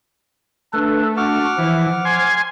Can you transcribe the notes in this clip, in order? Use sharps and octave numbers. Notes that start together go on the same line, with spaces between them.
A3 D4 A4 B4
D4 F#4 F#5 D6 F6
E3 F3
G#5 C6